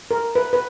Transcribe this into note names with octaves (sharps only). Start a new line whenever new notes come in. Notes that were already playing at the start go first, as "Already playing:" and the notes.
A#4
B4
B4